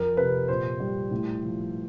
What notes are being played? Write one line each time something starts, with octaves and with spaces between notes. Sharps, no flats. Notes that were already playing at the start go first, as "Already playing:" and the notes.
Already playing: F2 A#4
C3 B4
A#2 C5
G3
A2
F3